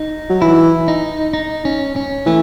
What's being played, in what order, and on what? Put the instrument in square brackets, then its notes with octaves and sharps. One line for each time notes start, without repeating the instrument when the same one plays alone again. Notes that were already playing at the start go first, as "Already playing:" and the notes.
Already playing: [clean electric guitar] D#4
[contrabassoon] F#3
[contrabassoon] E3 [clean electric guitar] E4
[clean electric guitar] D#4
D#4
C#4
C#4
[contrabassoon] E3 [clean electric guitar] A3